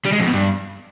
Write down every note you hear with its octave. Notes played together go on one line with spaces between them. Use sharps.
G3
G#3
F2
B2
G2